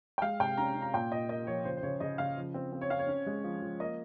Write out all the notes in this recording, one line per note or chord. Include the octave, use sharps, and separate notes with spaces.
G5
G#3 F5
C3 G5
C#4 A#5
C#4
A#5
A#2 G5
A#2 D#5
A#3 D#5
F3 C#5
C#3 C5
C5
C#3 C#5
C#3 D#5
C#3 F5
F3
C4
C4
C#5
C4 F5
C#5
C#4
G#3
F3
F3
A#3 D#5